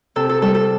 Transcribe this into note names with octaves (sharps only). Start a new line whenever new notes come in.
C3 A4
A4
G3 A4
A4